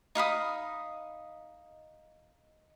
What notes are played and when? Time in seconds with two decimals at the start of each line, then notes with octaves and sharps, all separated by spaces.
0.15 D#4 F5 B5 D#6